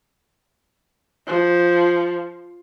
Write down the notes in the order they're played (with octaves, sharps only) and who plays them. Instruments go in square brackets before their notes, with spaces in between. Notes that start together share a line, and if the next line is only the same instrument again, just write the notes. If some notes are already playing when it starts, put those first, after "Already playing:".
[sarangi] F3